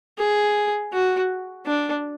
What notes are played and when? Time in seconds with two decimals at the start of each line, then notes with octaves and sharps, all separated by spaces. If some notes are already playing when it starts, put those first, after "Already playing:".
0.18 G#4
0.93 F#4
1.66 D4